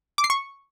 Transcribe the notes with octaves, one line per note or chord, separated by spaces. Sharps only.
D6
C7
C#6